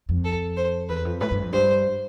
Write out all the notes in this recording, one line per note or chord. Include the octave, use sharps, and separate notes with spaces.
F2
A4
C5
E2 B4
F2
A2 B4
G2
F2
G2 C5